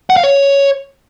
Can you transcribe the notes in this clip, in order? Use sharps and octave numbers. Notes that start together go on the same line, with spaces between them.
F#5
F5
C#5